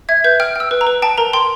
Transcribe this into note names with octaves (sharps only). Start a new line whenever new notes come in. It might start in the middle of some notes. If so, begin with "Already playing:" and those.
E5 G#6
B4 G6
G5 F6
G5 E6
B4
A#5
B4
G5 A5
A#4 A#5
G5 C6